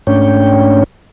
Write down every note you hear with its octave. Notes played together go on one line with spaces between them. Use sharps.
G#2 A3 C#4 D4 C#5 G5